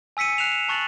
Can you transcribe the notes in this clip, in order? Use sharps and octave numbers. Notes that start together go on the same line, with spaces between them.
G#5 E6 B6 C#7 D#7
F#6 C7 E7 F7
A5 C#6 F#6 A6 F7 F#7